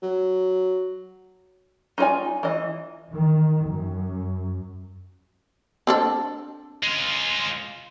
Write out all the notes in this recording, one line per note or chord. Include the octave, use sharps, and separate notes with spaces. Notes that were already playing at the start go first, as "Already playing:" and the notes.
F#3
D#4 F4 G#4 D5 G#5
E3 D#5
D#3
F#2
C4 D4 A4
G#3 F4